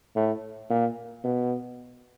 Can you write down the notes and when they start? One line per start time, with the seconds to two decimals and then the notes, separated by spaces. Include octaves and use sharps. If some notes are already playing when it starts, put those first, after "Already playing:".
0.16 A2
0.70 A#2
1.24 B2